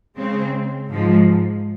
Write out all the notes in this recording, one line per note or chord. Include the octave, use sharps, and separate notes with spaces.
C#3 G#3 C4
G#2 F3 G#3